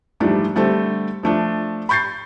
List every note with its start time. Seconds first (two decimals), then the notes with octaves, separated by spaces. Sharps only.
0.20 G#2 E3 F3 G3 A3 D4
0.55 D3 G3 A3 C4 A4
1.23 F3 A3 D4
1.89 B5 C#6 G6 A6 C7